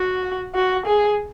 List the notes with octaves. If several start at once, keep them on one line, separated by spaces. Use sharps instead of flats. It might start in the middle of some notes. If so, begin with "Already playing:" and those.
Already playing: F#4
F#4
G#4